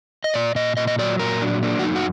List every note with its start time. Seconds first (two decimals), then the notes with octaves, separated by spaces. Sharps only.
0.24 D#5
0.34 A#2 D5
0.55 A#2 D#5
0.77 A#2 D#5
0.87 D#5
0.99 F#3 D5
1.19 A#2 A#4
1.41 F#3 D4
1.63 A#3 D4
1.79 F#4
1.84 F#2 D#4
1.95 F#4